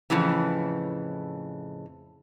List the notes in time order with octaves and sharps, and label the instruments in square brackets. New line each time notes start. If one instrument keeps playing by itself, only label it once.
[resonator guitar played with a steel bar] F2 A2 C#3 E3